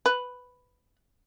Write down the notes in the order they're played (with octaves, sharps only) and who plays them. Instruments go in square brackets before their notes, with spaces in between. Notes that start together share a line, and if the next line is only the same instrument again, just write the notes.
[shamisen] B4